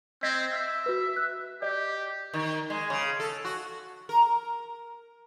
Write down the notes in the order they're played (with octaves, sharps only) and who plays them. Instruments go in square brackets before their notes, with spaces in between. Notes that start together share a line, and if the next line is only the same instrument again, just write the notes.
[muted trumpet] C4 [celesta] D#5 G#6 B6
[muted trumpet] E5
[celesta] F#4 B4
F#6
[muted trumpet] G4 [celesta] D5 D#5
[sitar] D#3
G#3
C#3
A4
F#4
A#4